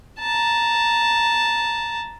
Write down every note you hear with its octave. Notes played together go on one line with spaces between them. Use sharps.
A5 A#5